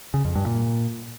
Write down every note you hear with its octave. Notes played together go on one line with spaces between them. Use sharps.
C#3
F2
G2
A#2